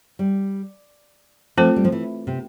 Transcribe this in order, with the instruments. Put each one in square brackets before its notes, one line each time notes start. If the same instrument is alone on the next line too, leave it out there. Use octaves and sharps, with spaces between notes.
[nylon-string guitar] G3
[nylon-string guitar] F3 [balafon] A3 C4 F4 A4 C5
[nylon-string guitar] G3
F3
E3
C3